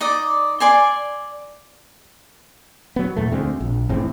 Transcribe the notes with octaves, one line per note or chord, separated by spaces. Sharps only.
D#4 D5 D#6
D5 G#5 C6
F#3 B3
E2 A#2 A3
D2 G#3 C4
A#1
G#1 E2 A2 C4